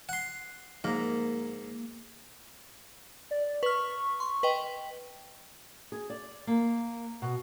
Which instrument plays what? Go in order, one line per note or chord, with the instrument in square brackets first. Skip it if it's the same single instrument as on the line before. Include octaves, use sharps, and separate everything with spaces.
[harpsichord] F#5 C6
[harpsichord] G#2 [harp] A#3
[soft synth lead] D5
[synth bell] B4 F6 [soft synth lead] C#6
[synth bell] C6
B4 D#5 G5
[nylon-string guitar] G#4
D5
A#3
B2